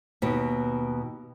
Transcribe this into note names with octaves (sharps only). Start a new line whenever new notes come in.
D#2 B2